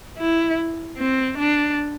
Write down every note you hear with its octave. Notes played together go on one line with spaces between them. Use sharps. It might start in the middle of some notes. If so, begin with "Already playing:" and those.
E4
C4
D4